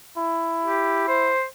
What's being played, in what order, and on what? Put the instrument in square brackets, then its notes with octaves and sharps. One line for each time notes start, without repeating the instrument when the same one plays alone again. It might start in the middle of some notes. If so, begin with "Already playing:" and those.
[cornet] E4
[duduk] G4
C5